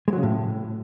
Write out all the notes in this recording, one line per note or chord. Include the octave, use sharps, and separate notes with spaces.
G#3
F#3
C#3
A2